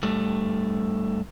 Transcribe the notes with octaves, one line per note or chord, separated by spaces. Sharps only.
G2 A3